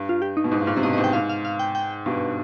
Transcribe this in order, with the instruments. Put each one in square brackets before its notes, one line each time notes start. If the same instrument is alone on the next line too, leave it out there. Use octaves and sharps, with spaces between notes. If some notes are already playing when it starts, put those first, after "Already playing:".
Already playing: [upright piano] G2
[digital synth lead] F4
G4
D#4
[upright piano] B2
[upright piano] G#2 [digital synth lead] D#4
[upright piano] G2
[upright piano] G#2 [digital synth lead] F4
[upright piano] C3
[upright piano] G2 B2 [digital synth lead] D#5
[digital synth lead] D#5
[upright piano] G#2
[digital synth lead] G5
[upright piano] G#2 [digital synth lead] F5
[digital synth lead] F5
F5
G5
G5
[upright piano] G2 B2